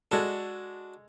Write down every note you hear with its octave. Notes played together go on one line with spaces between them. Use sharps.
G#3 D4 F#4 A4